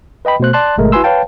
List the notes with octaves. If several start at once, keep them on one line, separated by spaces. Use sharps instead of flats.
B4 D#5 G5 B5
B2 A3 C5 F#6
D5 A5 C6 F#6
G#1 B2 G#3 A3 A#4
E4 F#4 B4 G#5 C6 E6
B4 C#5 F5 G5 A5